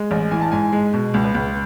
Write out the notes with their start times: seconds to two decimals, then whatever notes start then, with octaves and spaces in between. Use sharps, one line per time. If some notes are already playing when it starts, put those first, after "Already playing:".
Already playing: G#3
0.11 A1
0.31 E3 G#5
0.41 A5
0.52 G#2 G#5
0.72 G#3
0.93 B2
1.14 C#2
1.24 B4
1.35 C#2